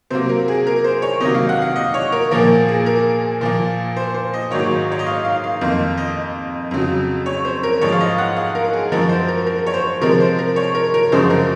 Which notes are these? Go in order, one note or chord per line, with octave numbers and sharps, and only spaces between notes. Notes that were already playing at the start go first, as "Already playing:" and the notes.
C3 F#3 A#3 C5
A#4
G#4
A#4
C5
C#5
C3 D#3 F#3 A#3 D#5
F5
F#5
F5
D#5
C#5
A#4
A#2 F3 A#3 A#4
G#4
A#4
A#2 F3 A#3
C5
C5
D#5
G#2 D#3 F#3 A#3 C#5
C#5
D#5
F5
F5
F5
F2 D#3 A#3 F5
D#5
F2 C#3 F#3
C#5
C5
A#4
G#2 F3 G#3 C#5
F5
D#5
F#5
F5
A#4
G#4
F#2 F3 G#3 A#4
C5
A#4
A#4
C#5
C5
C3 F3 G#3 A#4
C5
A#4
C#5
A#4
A#4
F#2 C#3 F3 G#3 C5
A#4